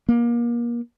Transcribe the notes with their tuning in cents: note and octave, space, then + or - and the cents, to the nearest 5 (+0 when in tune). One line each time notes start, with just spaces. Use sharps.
A#3 +30